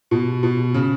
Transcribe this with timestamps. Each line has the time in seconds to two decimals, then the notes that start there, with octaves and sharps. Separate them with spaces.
0.11 B2
0.43 B2
0.74 C#3